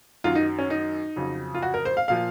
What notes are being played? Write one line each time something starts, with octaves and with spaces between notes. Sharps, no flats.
F#2 D#3 F#3 F4
D#4
C#4
D#4
F2 C#3 F#3
F4
F#4
A#4
C5
F5
A#2 F3 F5